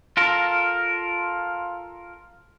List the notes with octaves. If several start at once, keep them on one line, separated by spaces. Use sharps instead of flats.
F4 A4 A#4